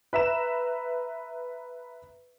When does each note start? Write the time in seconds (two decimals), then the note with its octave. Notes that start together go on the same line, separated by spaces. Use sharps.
0.13 B4 E5 A#5 E7